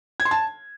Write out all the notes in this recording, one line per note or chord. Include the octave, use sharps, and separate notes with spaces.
G#6
C6
A5